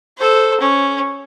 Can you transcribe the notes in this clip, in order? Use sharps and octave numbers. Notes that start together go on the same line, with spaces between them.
A4 C5
C#4